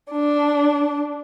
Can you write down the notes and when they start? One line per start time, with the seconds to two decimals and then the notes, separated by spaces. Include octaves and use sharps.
0.12 D4